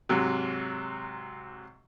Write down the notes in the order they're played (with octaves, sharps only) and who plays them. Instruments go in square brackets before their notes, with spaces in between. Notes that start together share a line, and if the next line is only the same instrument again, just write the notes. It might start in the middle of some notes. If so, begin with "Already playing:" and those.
[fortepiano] G#2 C3 F#3